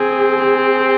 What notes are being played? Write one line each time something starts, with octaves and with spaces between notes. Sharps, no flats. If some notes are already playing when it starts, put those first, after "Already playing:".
Already playing: C4 G#4
G#4